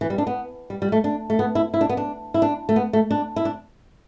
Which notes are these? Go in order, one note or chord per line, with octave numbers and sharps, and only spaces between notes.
E3
G3
D4
B3
G3
G3
A3
D4
A3
B3
E4
E4
D4
B3
D4
E4
D4
A3
B3
A3
D4
E4
D4